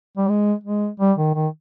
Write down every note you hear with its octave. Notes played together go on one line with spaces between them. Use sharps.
G3
G#3
G#3
G3
D#3
D#3